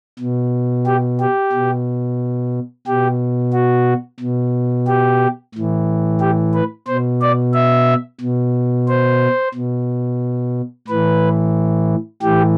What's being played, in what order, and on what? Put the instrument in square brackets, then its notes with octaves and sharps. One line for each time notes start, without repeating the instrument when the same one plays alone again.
[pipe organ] B2
G4
G4
B2
B2 G4
F#4
B2
G4
A2 E3
G4
B4
B2 C5
D5
E5
B2
C5
B2
A2 E3 B4
A2 E3 G4